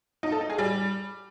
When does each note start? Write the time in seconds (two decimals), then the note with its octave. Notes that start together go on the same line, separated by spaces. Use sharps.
0.23 D#4
0.32 A4
0.41 D#4
0.50 G#4
0.58 G3